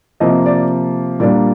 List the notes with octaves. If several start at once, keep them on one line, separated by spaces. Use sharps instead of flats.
C3 F3 A#3 D#5
D5
A#2 G3 A#3 D4 D5